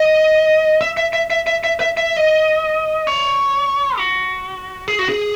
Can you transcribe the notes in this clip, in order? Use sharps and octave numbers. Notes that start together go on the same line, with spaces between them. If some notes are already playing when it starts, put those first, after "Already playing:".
Already playing: D#5
E5
E5
E5
E5
E5
E5
E5
E5
D#5
C#5
F#4
G#4
F#4
G#4